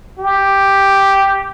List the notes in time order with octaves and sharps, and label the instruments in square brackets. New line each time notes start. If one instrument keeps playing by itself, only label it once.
[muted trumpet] G4